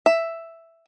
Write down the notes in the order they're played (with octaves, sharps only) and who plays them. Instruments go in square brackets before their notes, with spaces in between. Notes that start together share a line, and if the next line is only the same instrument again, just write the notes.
[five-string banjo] E5